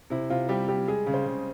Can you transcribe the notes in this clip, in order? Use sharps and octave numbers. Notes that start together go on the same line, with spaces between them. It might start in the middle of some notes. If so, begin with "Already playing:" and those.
C3 E4
C3 F4
G3 G4
G3 G4
G#3 G#4
C#3
C5
C#3